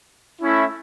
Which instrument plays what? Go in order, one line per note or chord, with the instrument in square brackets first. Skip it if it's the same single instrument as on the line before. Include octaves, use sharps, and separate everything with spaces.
[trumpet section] A3 C#4 E4